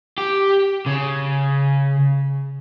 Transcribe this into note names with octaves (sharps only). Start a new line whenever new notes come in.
G4
C#3